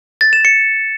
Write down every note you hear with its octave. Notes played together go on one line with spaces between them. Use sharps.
A6
E7
C#7